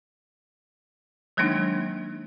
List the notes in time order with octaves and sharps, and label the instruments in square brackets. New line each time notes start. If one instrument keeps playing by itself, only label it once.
[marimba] D#3 F#3 G#3 A#3 D4 D#4